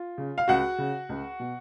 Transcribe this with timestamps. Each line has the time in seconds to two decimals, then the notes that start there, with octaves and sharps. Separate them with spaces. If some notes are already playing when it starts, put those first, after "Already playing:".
Already playing: F4
0.18 C#3
0.38 F5
0.48 C#2 F#4 F#5
0.78 C#3
1.09 C#2
1.40 B2